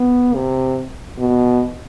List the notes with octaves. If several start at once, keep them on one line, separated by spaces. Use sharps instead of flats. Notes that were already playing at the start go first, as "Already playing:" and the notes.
Already playing: B3
C3
B2